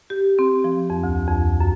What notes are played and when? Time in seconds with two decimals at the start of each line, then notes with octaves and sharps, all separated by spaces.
0.10 G4
0.39 C4
0.64 F3
0.90 F2
1.04 D2
1.28 F2
1.60 F#2